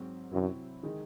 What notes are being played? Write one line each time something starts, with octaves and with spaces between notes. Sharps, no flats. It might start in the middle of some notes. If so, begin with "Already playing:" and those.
Already playing: G#2 F#3 C4
F#2 C3 F#3 C4 E4
D#3 G#3 D#4